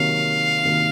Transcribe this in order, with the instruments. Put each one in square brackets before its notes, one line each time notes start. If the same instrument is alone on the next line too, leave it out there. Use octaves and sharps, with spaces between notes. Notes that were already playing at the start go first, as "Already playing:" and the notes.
Already playing: [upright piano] C3 D#3 F#3 A#3 [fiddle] F5
[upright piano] C3 D#3 F#3 A#3